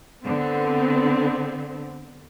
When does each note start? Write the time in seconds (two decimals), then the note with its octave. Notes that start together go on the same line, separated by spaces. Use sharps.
0.23 D3 B3 C4